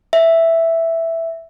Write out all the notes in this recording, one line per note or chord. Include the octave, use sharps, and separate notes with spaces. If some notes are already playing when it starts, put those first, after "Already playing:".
E5